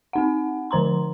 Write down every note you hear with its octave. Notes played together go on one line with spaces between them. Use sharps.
C4 D#4 F#5
D3 F3 C5 A#5 C6